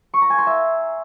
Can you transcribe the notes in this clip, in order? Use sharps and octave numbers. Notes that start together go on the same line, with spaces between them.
C#6
A#5
G#5
C6
E5